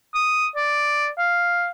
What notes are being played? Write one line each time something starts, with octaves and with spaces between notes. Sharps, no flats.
D#6
D5
F5